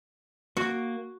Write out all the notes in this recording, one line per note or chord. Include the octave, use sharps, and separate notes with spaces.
A#3 F#4